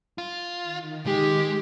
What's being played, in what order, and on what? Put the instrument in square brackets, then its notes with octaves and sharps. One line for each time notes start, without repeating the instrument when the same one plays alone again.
[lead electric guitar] F4
[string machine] D#3
[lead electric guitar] G#3 [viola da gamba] G4